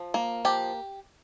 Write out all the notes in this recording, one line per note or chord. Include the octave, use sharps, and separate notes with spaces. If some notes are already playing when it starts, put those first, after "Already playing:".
Already playing: F3
A#3
F3 G4